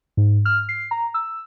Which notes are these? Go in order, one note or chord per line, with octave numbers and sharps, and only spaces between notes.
G#2
F6
C7
A#5
E6